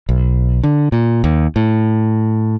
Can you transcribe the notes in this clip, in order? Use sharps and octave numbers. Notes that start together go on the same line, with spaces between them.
B1
D3
A#2
D#2
A2